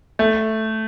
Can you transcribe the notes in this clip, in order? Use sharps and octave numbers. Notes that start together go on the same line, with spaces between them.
A3